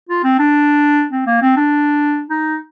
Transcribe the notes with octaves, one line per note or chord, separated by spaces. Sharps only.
F4
C4
D4
C4
A#3
C4
D4
D#4